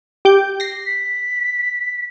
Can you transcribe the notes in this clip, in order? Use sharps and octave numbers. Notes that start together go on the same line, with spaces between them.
G4 D6 G6
A#6 C7
B6